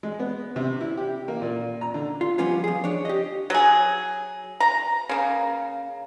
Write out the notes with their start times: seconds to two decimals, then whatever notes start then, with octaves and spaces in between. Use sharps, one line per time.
0.03 G#3
0.20 B3
0.56 C3
0.81 E4
0.97 G4
1.28 A#3
1.42 A#2
1.81 A#5
1.94 D3
2.21 F4
2.38 F3 G3 B3 C#4 F4
2.64 F3 G#4
2.84 D4 C#5
3.05 G4 D#5
3.50 F#3 G#4
4.60 A#5
5.09 C#3 A#3